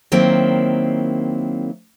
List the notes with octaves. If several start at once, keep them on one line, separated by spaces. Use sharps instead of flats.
D#3 F#3 A#3 C4 E4